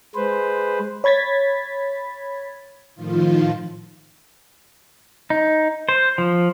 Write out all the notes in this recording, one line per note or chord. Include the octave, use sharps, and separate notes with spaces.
G#3 B4 C5
C#5 B5 G#6 A6 B6
A2 D#3 F3 F4
D#4
C5
F3